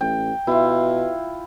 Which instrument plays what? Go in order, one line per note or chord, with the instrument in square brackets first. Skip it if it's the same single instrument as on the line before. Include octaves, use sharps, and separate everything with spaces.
[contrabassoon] A1 [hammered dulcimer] G5
[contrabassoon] B2 [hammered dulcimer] E4 F4